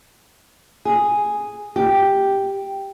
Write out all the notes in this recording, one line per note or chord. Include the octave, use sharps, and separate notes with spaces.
G#4
G4